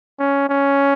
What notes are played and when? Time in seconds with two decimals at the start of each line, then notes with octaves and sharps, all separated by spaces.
0.19 C#4
0.49 C#4